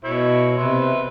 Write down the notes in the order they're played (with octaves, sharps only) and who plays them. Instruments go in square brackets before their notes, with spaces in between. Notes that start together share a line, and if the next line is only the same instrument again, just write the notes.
[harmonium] B2 [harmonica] E4 C#5
[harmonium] C3 [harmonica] B4 E5 C6